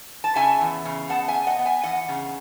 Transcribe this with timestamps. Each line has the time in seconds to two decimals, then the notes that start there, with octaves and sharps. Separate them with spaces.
0.24 A5
0.36 C#3 E5 G#5
0.61 E2
0.85 C#3
1.10 B3 F#5 A5
1.28 E5 G#5
1.35 B3
1.47 D#5 F#5
1.59 B3
1.65 E5 G#5
1.83 E2 D#5 F#5
2.09 C#3